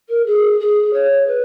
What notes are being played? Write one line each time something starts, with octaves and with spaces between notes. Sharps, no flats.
A#4
G#4
G#4
C#5
B4